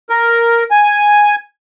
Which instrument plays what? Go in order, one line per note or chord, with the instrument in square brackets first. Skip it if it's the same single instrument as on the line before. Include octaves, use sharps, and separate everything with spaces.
[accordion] A#4
G#5